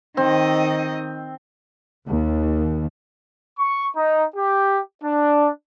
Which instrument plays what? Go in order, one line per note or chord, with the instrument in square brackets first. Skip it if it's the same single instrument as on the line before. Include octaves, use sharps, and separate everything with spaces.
[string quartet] D#3 D#5 [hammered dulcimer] C4
[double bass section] D#2
[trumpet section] C#6
D#4
G4
D4